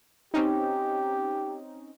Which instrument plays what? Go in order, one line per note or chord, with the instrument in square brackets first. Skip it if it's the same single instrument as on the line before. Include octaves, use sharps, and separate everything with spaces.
[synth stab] C4 C#4 D#4 [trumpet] G4